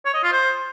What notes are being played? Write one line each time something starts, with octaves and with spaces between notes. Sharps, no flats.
C#5
D#5
F4
C5